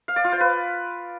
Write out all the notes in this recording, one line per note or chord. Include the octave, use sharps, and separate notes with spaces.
F5
D5
F4
C5
B4